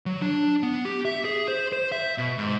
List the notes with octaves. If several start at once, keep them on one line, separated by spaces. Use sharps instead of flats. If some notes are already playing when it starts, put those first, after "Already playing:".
F#3
D4
B3
G4
E5
G#4
C5
C5
E5
B2
G#2